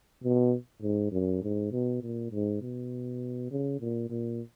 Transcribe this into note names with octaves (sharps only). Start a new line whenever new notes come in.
B2
G#2
F#2
G#2
B2
A#2
G#2
B2
C#3
A#2
A#2